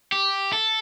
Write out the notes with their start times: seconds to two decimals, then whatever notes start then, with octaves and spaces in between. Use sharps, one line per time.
0.12 G4
0.53 A4